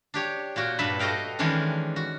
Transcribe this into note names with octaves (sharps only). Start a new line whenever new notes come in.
D4 G4 C#5
A#2 F4 F#4 G5
G2 A#2 B4 E5 A5 B5
F#4 A4 D#5 F5 G5
D#3 E3 G#3 C#4 D4
F#4